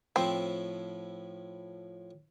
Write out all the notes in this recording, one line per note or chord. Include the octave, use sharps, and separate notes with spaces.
A2 F3 C4 E4